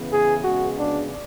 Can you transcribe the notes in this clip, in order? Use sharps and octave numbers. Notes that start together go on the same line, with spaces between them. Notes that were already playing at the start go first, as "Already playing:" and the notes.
Already playing: C#3 E3 B3
G#4
C#3 G#3 B3 F#4
D4